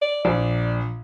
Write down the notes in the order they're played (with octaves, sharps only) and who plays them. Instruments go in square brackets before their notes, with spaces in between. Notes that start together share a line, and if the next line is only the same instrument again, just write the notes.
[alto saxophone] D5
[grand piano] A#1 [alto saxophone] D5